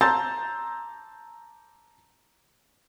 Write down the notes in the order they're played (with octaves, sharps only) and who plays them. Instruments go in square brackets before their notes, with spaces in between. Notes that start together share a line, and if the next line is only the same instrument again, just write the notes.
[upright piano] A5 A#5 C6 E6 G6 A6